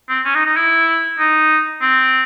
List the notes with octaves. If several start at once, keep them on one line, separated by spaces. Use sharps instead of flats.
C4
C#4
D#4
D#4
E4
D#4
C4